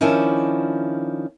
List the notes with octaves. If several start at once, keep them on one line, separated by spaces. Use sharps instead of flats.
D#3 F3 C#4 D4 E4